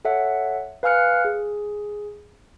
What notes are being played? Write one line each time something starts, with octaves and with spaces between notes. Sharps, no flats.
A4 C#5 E5 F#5
B4 F5 G#5 F6 F#6 C#7
G#4